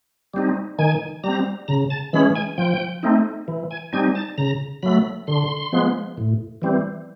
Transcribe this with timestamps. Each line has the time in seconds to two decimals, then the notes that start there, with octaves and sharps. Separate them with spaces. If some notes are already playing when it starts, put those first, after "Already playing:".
0.34 G3 C4 D#4
0.79 D#3 G#5
1.24 G3 C4 A#5
1.68 C#3 A#5
1.90 A5
2.13 E3 G#3 C#4 B5
2.36 G#5
2.58 F3 G5
3.03 A3 C4 D#4
3.48 E3
3.71 G#5
3.93 G3 C4 D#4 G#5
4.15 A5
4.38 C#3 A#5
4.83 F#3 A3 B5
5.27 D3 C6
5.73 F3 G#3 B3
6.18 A2
6.62 E3 G3 C4